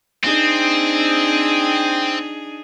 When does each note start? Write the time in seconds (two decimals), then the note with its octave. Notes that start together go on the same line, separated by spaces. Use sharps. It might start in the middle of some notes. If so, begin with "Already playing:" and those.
0.24 C4 D4 D#4 G#4